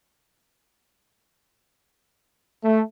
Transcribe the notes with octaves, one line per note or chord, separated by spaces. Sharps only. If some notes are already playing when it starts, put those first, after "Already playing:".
A3